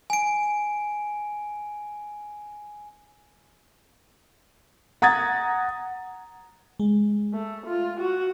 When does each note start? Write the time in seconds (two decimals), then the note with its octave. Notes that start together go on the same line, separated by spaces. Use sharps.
0.10 G#5 D7
5.02 F#5 A#5 D#6 G#6 A6
6.80 G#3
7.33 A3
7.67 F4
8.00 F#4